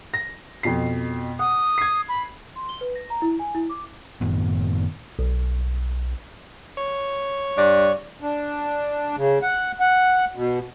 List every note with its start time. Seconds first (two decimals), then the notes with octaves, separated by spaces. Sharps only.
0.14 A#6
0.63 F2 B2 C7
1.39 F#5 D#6
1.78 G#6 C7
2.09 B5
2.56 C6
2.69 G7
2.81 B4
2.95 A#6
3.10 A#5
3.22 E4
3.39 G#5
3.55 E4
3.70 D6
4.21 F#2 A2 D#3 B3
5.19 B1
6.77 C#5
7.57 G2 D5
8.22 D4
9.17 C#3
9.42 F#5
9.80 F#5
10.35 B2